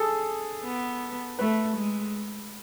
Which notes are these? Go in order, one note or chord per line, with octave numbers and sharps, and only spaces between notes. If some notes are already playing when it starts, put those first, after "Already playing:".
Already playing: G#4 A4
B3
A3 B4
G#3